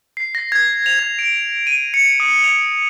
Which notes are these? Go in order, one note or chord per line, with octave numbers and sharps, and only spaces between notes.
C7
A#6
G#6
F7
G#6
D7
D#7
C#7
D#6
F7